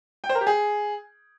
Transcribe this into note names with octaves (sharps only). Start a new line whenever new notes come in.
G5
C5
A#4
G4
G#4